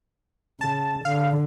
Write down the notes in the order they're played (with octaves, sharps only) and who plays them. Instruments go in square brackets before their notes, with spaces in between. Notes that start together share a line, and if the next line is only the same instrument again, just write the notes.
[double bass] C#3 [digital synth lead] A5
[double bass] D3 [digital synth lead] F5